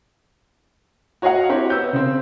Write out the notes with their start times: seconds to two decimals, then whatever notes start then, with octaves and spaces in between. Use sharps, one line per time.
1.22 F#4 C#5 D#5 F5 F#5
1.49 C4 E4 F#4 G4 C#5
1.70 B3 E6 G6
1.93 C#3 C4